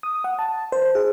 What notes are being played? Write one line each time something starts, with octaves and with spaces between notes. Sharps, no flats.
D#6
F#5
A5
C5
G#4